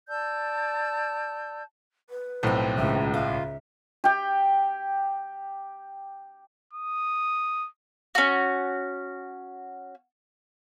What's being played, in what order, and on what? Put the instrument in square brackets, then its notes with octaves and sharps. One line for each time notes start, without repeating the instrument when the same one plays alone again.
[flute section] D5 A5 E6 G6
[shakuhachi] B4
[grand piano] B1 A2 [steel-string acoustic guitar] F3 C4
[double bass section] C#2 [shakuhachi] E5
[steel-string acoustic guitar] F4 [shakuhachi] E5
[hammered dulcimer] G4 G5
[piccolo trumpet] D#6
[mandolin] C#4 F#4